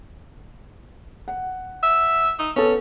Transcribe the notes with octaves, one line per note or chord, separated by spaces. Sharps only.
F#5
E5
D#4
B3 C#4 A4